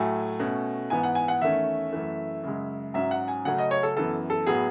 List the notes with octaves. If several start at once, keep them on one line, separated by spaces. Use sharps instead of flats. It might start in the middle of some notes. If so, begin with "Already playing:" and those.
Already playing: A2 F#3 A3 G#5
B2 A3 C#4
G#2 E3 B3 G#5
F#5
G#5
F#5
E2 D#3 A3 C#4 E5
F#2 E3 A3
F#2 C#3 G#3
G#2 F#3 C#4 E5
F#5
G#5
C#3 F#3 A3 C#4 F#5
D#5
C#5
A4
F#2 E3 B3 A4
A4
A2 F#3 B3 G#4